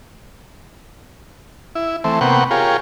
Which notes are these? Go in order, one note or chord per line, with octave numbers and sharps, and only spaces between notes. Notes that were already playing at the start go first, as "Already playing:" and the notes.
E4
E3 A3 C4
C3 A#3 B3 F#5 G5 C#6
F4 G4 G#4 A#4 C#5